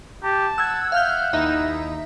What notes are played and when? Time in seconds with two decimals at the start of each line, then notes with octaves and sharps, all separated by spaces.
0.23 G4 A5
0.58 F#5 E6 G#6
0.92 E5 F5 F6 G6
1.33 D#2 D#4 E4 E5 A#6